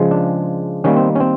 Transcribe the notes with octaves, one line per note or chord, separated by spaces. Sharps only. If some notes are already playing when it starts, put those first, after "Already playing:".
Already playing: C#3 F3 G#3
D4
D#3 G3 A#3 C#4
C4
C#4
C4